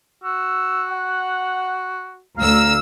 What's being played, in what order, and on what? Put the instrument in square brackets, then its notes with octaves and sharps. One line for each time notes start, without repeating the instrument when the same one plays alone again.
[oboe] F#4 [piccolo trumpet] E6
[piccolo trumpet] F#5
[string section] D2 E6 [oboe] F5 [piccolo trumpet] A#5